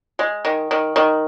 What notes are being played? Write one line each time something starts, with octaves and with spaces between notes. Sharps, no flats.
G#3
D#3
D#3
D#3